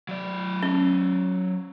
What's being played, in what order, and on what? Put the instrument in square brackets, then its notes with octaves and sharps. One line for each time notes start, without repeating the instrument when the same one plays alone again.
[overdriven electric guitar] F#3 D5
[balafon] C#4